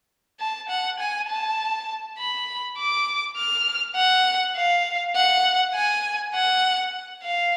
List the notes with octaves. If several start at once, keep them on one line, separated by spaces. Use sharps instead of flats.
A5
F#5
G#5
A5
B5
D6
F6
F#5
F5
F#5
G#5
F#5
F5